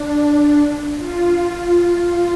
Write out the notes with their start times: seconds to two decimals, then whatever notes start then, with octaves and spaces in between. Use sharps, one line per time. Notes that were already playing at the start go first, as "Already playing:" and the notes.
Already playing: D4
0.97 F4
1.71 F4